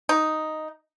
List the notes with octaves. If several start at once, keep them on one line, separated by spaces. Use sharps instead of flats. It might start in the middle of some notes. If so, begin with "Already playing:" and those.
D#4